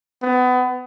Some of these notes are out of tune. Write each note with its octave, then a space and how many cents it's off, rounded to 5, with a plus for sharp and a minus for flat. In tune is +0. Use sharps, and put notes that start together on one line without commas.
B3 +30